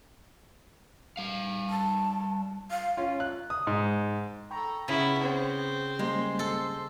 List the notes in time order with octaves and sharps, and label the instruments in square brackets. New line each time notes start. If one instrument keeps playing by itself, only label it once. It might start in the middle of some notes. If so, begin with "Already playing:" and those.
[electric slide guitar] G3 F5
[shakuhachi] A5
F5
[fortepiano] C#4 F4
F#6
D#6
G#2
[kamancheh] A4 A#5 [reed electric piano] G5 B5 C#6
[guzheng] C#3 [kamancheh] B3 C#5 [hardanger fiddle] E4
[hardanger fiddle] C4
[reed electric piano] G3 A#3 C#4 [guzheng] G#3 [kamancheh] C5
[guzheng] A4